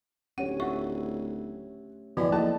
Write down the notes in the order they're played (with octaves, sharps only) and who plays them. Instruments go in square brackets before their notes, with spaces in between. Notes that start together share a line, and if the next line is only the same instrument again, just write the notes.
[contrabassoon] D1 [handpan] C#4 G4 C#5 [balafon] F#5
[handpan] A3 E5 [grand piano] F4 F#5 [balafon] C#6
[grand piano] D1 [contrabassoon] B2 [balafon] F3 B3 E4 [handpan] D5
[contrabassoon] E2 [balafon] A#3 [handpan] D#4 A4 [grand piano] D#5 A5